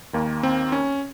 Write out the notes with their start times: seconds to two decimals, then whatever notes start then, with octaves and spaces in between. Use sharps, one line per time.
0.13 D#2 D#3 A#3
0.43 C4
0.72 C#4